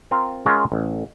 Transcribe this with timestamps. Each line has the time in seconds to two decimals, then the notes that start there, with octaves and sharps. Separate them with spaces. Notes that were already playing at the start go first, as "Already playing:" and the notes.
0.11 C4 F4 A#4
0.46 G#3 C#4 F4 A#4 C#5 F#5
0.72 A1